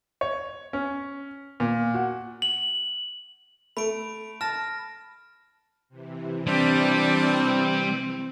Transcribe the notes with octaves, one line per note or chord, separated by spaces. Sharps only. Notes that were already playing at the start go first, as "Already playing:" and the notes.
C#5
C#4
A#2
F#4
F#7
A3 B5 D7
A5 F6 A#6
C3 E3
G3 C4 D4